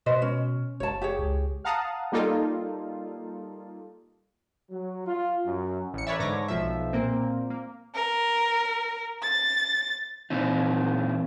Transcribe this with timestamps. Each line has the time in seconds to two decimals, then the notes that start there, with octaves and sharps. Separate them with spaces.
0.06 B2 B4 C5 D#5
0.22 C#4
0.80 F#1 C#5 A5
1.02 G4 G#4 C#5
1.19 C#2
1.65 F5 F#5 A5 A#5 D#6
2.12 G3 A#3 D#4 F4 A4
4.70 F#3
5.06 F4
5.46 F#2
5.94 A1 C#7
6.07 A#4 B4 C#5 D5 E5
6.19 G#2 D3 C#5 D6 A#6
6.48 B1 F3 E5
6.93 A#2 A#3 C4
7.50 A#3
7.95 A#4
9.23 A6
10.30 A#2 E3 C4 D#4